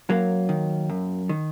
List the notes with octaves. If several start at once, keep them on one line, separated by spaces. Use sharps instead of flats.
F#2 F#3 A#3
D#3
F#2
D#3